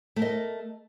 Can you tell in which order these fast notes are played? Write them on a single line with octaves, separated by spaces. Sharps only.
A3 A#4 D#5